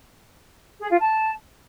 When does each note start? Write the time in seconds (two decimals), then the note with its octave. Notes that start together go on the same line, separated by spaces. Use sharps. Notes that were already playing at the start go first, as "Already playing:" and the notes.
0.81 G#4
0.91 F4
1.00 A5